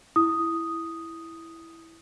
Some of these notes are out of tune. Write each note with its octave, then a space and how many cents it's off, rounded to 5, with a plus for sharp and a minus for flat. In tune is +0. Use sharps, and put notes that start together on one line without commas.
E4 +0 D#6 +0